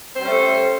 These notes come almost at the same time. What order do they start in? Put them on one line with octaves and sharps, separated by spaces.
C5 G3 C#4 A3 A4